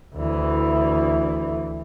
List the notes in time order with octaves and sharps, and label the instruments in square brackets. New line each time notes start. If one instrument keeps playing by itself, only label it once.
[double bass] D2 E3